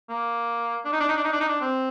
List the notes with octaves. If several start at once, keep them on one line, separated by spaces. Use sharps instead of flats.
A#3
D4
D#4
D4
D#4
D4
D#4
D4
D#4
D4
C4